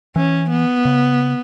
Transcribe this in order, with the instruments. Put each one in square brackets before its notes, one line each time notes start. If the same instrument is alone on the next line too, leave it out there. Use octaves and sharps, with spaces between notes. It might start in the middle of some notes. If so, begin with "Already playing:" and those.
[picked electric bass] E3 [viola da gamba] C#4
[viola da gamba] B3
[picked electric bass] C#3